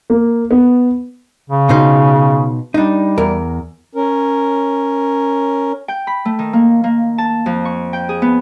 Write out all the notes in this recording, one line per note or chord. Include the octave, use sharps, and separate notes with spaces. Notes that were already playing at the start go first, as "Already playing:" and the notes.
A#3
B3
C#3
B2 D#4 C5
G3 D4 D#4
E2 A#4
C#4 A#4
G5
B5
A3
D#3
A#3
A#3
A5
F2
C#6
G5
G#4
B3